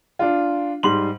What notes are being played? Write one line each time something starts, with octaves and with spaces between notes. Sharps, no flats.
D4 F4
G#2 G3 C6 F#7